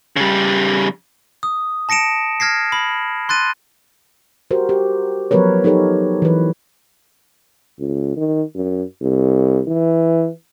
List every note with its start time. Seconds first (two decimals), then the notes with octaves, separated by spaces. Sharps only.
0.16 C#3 G3
1.43 D#6
1.89 A5 A#6 C#7 D7 E7
2.40 F6 G#6 A#6 C7
2.72 B5
3.29 C6 F#6 A6 D#7
4.51 F#4 G4 A#4 C5
4.69 G4
5.31 F3 F#3 B3 A#4 B4 C#5
5.64 D#4 G4 A4 A#4 C#5
6.22 E3 B4
7.79 C#2
8.17 D#3
8.55 F#2
9.01 C2
9.68 E3